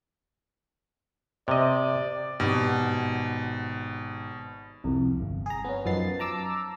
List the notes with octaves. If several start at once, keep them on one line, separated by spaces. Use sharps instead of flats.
C3 D5 D#5
G#1 B2 G4
C2 F2
G1
G#4 A#5
B3 C#4
F#2 F3 B3 D#4 A6 C7
A5 A#5 D6 E6